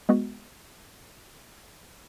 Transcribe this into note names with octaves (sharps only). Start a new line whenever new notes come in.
G#3 B3 F#4